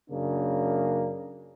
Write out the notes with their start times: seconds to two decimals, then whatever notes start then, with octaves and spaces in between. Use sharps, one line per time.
0.11 F#2 C#3 A#3 D4